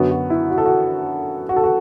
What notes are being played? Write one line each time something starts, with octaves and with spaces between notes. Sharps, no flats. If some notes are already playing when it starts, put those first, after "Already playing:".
Already playing: F#2 D3 B3 F#4
F#4
E4
F#4
A4
F#4
F#4
A4
F#4